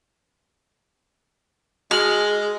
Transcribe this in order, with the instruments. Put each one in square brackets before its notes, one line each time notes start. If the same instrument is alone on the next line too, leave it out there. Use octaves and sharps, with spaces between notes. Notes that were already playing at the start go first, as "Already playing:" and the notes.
[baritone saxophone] G#3 [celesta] F#4 F#7 [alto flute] G#4 [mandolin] F6